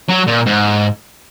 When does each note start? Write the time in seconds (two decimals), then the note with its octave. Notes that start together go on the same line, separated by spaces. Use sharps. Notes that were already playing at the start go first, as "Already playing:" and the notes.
0.09 F#3
0.27 A#2
0.46 G#2